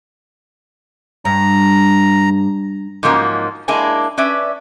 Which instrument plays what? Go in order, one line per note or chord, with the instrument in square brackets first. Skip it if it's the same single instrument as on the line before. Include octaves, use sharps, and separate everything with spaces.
[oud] G2 [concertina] A#5
[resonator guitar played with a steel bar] G#2 F3 F#3 A#3 C#4 D#4
G#3 A#3 D4 E4 G#5
C#4 B4 D5 E5